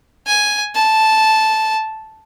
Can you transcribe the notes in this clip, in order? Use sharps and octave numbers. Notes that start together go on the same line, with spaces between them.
G#5
A5